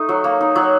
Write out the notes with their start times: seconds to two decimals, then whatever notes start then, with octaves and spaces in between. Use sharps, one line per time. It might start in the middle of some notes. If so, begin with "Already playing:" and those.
Already playing: A3 D#4
0.09 F#3
0.24 A#3
0.41 D#4
0.56 F#3